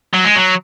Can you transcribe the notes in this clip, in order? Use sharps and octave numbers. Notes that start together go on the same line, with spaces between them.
F#3
G#3
F#3